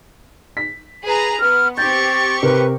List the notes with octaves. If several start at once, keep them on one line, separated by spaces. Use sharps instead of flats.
B6
G#4 B4 A#5
B3 F6
C4 G4 C#6 G6 A6
C3 A#4 B4